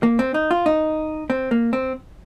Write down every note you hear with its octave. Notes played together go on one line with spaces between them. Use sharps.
A#3
C4
D#4
F4
D#4
C4
A#3
C4